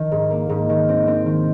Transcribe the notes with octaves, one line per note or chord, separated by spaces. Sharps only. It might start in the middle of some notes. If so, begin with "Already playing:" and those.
Already playing: D#3
G#2
A#3
G#2
D#3
C4
C4
D#3